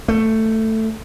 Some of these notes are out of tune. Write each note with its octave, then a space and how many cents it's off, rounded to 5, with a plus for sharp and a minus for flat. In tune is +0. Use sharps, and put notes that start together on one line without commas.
A3 +10